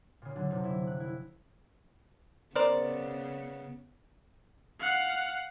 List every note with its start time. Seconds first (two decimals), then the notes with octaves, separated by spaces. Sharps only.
0.22 A#2 C#3
0.36 D3 F#3 D4
0.51 F#1 C3 F3
0.64 E4 E5
0.87 F#6
1.00 E4
2.55 C#3 B3 A#4 C5 D5
4.80 F5 F#5